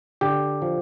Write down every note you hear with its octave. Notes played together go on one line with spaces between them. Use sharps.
D3 G4
F3